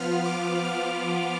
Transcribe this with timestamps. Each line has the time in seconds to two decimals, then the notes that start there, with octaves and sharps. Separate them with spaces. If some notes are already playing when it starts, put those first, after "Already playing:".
Already playing: F3 B3 F4 F6
0.26 D6
0.64 F6